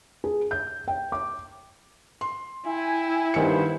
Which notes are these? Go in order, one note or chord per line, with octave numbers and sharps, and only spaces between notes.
G#4
G6
G5
D6
C6
E4 E5 G5 G#5
G2 D#3 B3 C5 C#7